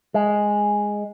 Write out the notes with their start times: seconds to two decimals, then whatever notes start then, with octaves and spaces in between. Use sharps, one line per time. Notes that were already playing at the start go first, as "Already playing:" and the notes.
0.14 G#3